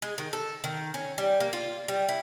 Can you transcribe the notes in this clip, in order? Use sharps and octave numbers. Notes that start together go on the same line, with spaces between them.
G#3
D#3
A4
D#3
C#4
G3
A#3
F4
G3
E4